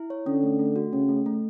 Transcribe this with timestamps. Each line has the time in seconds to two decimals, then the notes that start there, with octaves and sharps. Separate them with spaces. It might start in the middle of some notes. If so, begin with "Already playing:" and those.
Already playing: E4
0.10 C#5
0.26 D3 C#4
0.43 A3
0.59 A3
0.76 F#4
0.93 C#3 C#4
1.09 A3
1.26 A3